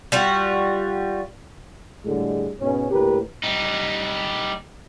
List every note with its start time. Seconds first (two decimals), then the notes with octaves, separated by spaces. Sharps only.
0.12 G3 F4 F#4
2.05 A2 D3 G3 G#3
2.60 G#2 B2 B3 C#4
2.91 D2 A2 A#3 G4 A#4 B4
3.43 G3 D#4